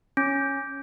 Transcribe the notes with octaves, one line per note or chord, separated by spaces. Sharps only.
C#4